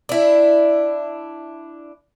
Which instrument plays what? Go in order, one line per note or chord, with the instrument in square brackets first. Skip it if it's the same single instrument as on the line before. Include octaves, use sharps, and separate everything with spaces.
[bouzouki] D4 E4